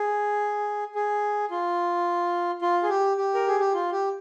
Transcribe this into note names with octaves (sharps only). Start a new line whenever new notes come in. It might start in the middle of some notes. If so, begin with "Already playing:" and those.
Already playing: G#4
G#4
F4
F4
G#4
G4
G4
A#4
G#4
G4
F4
G4